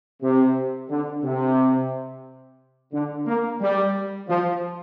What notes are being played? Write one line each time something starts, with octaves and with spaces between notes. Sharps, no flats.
C3
D3
C3
D3
A#3
G3
F3